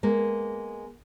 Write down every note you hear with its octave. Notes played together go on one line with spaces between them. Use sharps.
G#3 A#3 B3